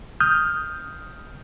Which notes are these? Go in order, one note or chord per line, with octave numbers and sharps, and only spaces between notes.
D#6 F6 G6